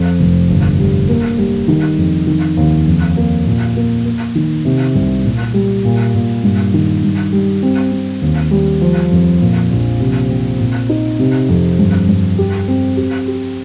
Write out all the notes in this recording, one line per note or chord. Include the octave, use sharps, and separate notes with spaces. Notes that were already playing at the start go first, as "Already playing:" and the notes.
Already playing: F2
F1
G1
G3
A#3
G3
D#3
F2
D#3
D#2
F2
A#3
A#2
A#3
A#3
D#3
C3
C2
A#2
G3
A#2
A#2
G2
D#3
G2
G3
C4
C4
D#2
G3
F3
F2
A#2
A#1
C3
C4
A#2
D#4
C3
F2
G2
G2
G4
C4
G4
G4